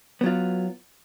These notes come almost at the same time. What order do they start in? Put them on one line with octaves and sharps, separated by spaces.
B3 F#3 F4